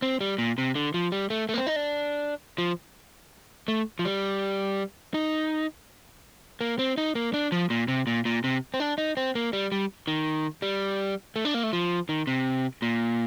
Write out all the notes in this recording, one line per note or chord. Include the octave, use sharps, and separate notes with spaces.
C4
G3
A#2
C3
D3
F3
G3
A3
A3
A#3
C4
D#4
D4
F3
A3
F3
G3
D#4
A#3
C4
D#4
A#3
D4
F3
A#2
C3
A#2
A#2
C3
C4
D4
D#4
C4
A#3
G3
G3
D#3
G3
A3
D4
A#3
A3
F3
D#3
C3
A#2